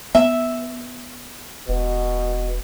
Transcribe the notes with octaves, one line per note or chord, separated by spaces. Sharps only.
B3 E5
E1 B2